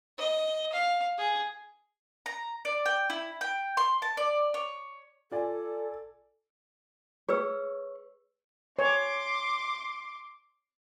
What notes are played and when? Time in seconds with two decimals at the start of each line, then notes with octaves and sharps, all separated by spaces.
0.18 D#5
0.73 F5
1.18 G#4
2.26 A#5
2.65 D5
2.86 G5
3.10 E4
3.41 G5
3.77 C6
4.02 A5
4.17 D5
4.54 C#5
5.32 F4 A4 D5 G#5
7.29 G#4 B4 C#5 E6
8.79 C#5 C6 D6